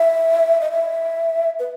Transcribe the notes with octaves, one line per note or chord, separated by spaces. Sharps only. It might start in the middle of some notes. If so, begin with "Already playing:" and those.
Already playing: E5
D#5
E5
B4